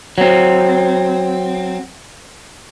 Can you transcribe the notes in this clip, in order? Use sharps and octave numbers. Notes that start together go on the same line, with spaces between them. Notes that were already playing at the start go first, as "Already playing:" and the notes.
F#3 C4